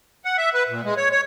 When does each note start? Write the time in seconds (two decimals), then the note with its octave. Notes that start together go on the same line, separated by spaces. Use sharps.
0.25 F#5
0.37 E5
0.54 B4
0.69 A#2
0.84 G#3
0.97 C#5
1.12 C#5